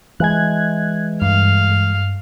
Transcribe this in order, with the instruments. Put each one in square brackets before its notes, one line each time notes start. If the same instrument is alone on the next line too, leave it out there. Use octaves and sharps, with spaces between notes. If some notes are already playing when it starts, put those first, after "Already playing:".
[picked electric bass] E3 G#3 [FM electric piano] F#6 G#6
[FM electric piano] G2 [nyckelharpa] F5